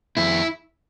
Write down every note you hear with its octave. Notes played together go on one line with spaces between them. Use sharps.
F2 E4